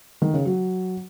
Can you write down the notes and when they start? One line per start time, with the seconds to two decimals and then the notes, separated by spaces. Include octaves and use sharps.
0.22 D#3
0.33 C#3
0.45 F#3